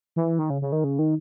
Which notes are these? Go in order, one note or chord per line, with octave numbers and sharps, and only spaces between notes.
E3
D#3
C#3
C#3
D#3
C#3
D#3